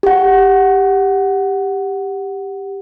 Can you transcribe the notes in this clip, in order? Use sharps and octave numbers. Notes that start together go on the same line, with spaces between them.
G4 F#5